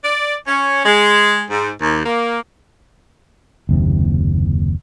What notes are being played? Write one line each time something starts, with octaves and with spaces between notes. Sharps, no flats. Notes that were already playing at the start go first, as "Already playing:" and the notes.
D5
C#4
G#3
G#2
D#2
A#3
F#1 D#2 C3